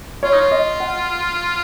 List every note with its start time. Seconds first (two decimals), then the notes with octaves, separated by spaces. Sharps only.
0.23 F4 C#5
0.33 D#4
0.41 F4
0.51 D#5
0.80 F#5